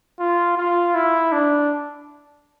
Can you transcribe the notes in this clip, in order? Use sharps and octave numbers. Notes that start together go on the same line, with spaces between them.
F4
F4
E4
D4